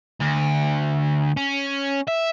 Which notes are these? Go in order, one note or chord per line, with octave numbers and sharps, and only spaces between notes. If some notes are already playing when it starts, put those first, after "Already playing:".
D2
C#4
E5